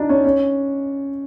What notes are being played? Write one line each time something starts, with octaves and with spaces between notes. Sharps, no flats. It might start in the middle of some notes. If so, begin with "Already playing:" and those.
Already playing: D4 D#4 F4
C#4
C#4